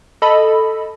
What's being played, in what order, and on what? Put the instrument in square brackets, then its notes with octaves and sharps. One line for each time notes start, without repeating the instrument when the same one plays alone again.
[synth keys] A4 D#5 A5 B5